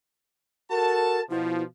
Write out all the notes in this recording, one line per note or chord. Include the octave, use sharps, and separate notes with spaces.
F#4 A4 A#4 A5
B2 F3 E4